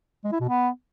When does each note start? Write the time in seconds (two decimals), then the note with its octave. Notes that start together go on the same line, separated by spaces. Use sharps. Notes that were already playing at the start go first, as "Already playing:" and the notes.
0.24 G#3
0.32 E4
0.40 B2
0.48 B3